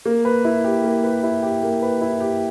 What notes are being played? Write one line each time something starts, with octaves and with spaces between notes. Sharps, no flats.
A#3
B4
E4
G4
A#3
B4
E4
G4
A#3
B4
E4
G4